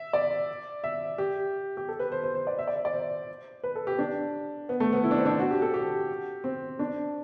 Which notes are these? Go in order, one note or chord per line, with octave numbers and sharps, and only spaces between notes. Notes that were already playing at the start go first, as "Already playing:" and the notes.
Already playing: E5
D5
E5
G4
G4
A4
B4
C5
C5
C5
D5
E5
D5
E5
D5
C5
B4
A4
G4
D4
B3
A3
B3
E4
D4
C4
D4
F#4
G4
A4
G4
C4
D4